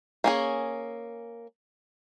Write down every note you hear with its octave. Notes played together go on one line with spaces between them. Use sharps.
A#3 C#4 G#4